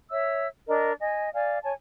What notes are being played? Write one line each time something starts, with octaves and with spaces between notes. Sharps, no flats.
C#5 E5 E6
D4 A#4 D#5
D#5 G#5
D5 F5 G#5
C#5 G#5 A5